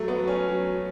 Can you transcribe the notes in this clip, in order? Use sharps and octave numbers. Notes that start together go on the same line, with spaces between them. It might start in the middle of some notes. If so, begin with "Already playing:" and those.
Already playing: F#3 A3
B3
F#3
C#4
F#3